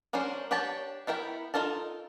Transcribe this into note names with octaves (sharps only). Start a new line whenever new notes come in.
G3 C#4 D4 A#4 C5
D4 G4 C#5 G5 A5
B3 E4 A#4 G5
D#4 F4 A4 A#4 A5